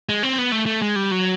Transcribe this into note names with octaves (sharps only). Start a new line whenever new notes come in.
G#3
C4
B3
A3
A3
G#3
G3
F#3